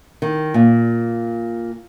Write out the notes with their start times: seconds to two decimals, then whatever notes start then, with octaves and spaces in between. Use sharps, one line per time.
0.22 D#3
0.54 A#2